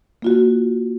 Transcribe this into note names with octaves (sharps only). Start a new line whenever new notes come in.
A#3 F4 F#4